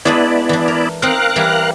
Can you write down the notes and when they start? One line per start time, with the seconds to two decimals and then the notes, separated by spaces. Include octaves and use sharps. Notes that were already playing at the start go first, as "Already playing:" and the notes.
0.05 G#3 B3 D4 E4 B4 D5
0.49 E3 D4
0.68 A#4
1.02 C4 D#4 A#4 F5 F#6
1.36 E3 G3 E4